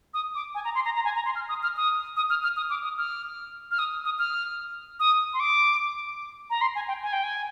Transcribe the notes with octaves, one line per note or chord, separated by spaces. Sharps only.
D#6
D6
G#5
A#5
C6
A#5
A#5
G#5
A#5
C6
F6
D#6
F6
D#6
D#6
F6
F6
D#6
D6
D#6
F6
F6
D#6
D#6
F6
D#6
C6
D6
A#5
C6
G#5
G5
G#5
G5
G#5